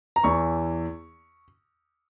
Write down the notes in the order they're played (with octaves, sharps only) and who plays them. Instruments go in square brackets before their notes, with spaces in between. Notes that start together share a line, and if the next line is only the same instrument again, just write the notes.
[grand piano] A#5
E2 E3 C#6